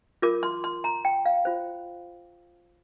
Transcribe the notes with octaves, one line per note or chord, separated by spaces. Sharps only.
F4 A#4 D6
C6
C6
A#5
G5
F5
F4 C5